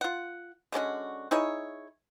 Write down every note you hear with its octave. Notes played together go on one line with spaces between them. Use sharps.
F4 F#5
D3 G#3 C#4 F#4
D#4 E4 G#4 C#5